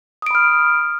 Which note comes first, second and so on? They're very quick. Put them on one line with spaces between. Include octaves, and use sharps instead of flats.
D#6 D7 B5 F6